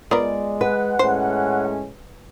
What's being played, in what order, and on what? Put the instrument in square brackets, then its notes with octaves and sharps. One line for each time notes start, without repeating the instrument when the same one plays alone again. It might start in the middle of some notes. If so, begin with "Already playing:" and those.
[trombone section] G#3 [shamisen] B3 F4 A#4 [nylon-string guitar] D5
[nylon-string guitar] B4 [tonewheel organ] F#5
[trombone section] A2 G#3 C#4 [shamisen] C5